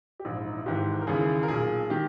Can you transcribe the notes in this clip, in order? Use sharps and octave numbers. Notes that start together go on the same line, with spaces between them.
G4
A#1 G#2 E3 E4
D#4
E4
G#1 G#2 E3 G4
A#4
D#2 C#3 E3 G#4
A#4
B1 A#2 G#4
D#3 G4